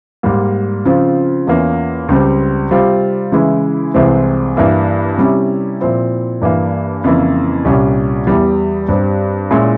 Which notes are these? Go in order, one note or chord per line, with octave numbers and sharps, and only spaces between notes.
G#2 G3 A#3
C#3 F3 C4 F4
E2 E3 A#3 C#4 F4
C#2 C#3 G3 C4
C3 G3 C4 F4
C#3 E3 G#3 E4
C2 C3 E3 G#3 C4
G2 E3 A#3 E4
C3 G3 C#4 E4
A#2 F3 C4 E4
G2 E3 A#3
F2 C#3 E3 A#3 E4
C2 A#2 G3 C#4
E2 E3 G3
G2 G3 C4
A#2 G#3 C#4 E4